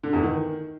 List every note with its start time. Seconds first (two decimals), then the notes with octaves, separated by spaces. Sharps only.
0.03 D3
0.13 E2
0.23 D#3